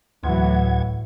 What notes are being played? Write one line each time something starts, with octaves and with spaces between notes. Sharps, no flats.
D2 A2 E3 F#3 F#5 G#6